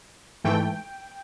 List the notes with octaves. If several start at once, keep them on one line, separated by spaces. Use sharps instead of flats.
G#2 E3 A3 G5